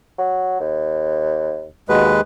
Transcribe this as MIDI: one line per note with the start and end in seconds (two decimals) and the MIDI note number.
0.18 0.57 54
0.61 1.66 39
1.89 2.21 39
1.89 2.11 47
1.89 2.21 56
1.89 2.21 71